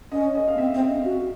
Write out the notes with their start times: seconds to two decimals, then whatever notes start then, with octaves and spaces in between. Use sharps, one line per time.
0.12 C#4 D#5
0.35 D#5
0.48 F5
0.55 B3
0.58 C4 E5
0.74 C4
0.82 D#5
0.90 C#4
1.05 F#4